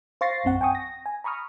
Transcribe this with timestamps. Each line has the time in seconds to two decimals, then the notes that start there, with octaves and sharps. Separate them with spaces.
0.21 C5 F5 C#6 A6 A#6 C7
0.44 A#1 F#2 C4 F#5
0.61 G5 G#5 C#6 D#6
0.75 A#6
1.06 G#5
1.24 A#5 B5 C#6 D#6 F6